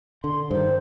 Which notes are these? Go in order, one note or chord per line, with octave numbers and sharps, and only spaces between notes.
D3 C6
G2 D#3 C5